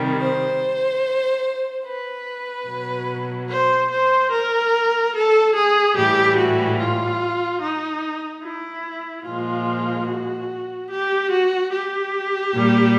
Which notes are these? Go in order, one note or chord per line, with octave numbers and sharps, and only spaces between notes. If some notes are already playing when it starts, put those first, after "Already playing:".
Already playing: C3 D#3 G3
C5
B4
B2 F#3
C5
C5
A#4
A4
G#4
A2 E3 G3 G4
F#4
F4
D#4
E4
A#2 F3 G#3 F4
F#4
G4
F#4
G4
A#2 G3